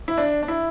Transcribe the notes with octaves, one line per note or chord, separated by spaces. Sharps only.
E4
D4
D4
E4